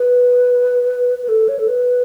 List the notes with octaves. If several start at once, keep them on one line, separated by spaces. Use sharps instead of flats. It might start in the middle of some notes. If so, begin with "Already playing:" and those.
Already playing: B4
B4
A4
C#5
A4
B4